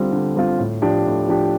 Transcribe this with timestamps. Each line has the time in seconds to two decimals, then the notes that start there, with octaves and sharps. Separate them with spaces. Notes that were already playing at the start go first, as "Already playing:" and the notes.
Already playing: D3 G3 C4 F4
0.12 D3
0.36 G3 C4 F4
0.59 A2
0.82 F3 D4 G4
1.06 A2
1.28 F3 D4 G4